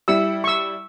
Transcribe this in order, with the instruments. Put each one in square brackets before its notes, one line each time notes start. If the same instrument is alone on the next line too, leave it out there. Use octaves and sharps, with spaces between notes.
[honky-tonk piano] G3 E4 C#7 [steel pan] E6
[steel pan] C#6 E6